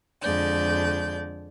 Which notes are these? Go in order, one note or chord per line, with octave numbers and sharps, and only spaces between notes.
F2 D3 G#3 D5 G6